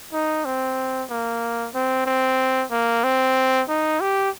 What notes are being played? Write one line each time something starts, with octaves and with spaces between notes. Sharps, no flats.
D#4
C4
A#3
C4
C4
A#3
C4
D#4
G4